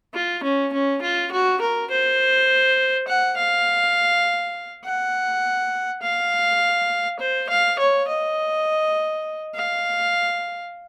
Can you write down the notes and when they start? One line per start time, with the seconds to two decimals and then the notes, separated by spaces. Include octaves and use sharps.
0.14 F4
0.43 C#4
0.73 C#4
1.02 F4
1.32 F#4
1.61 A#4
1.90 C5
3.07 F#5
3.37 F5
4.84 F#5
6.02 F5
7.19 C5
7.49 F5
7.79 C#5
8.08 D#5
9.55 F5